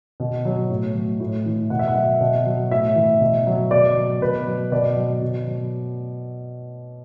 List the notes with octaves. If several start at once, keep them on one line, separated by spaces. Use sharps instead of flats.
B2
F#3
A2
F#3
A2
E3
B2 F#5
E5
F#5
F#3
B2
F#3
A2 E5
E3
B2
F#3
B2 D5
F#3
B2 B4
F#3
B2 D5
F#3
B2
F#3